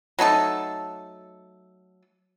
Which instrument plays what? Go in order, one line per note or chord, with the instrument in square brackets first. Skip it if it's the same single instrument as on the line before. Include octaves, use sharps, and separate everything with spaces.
[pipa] F#3 A3 D#4 A4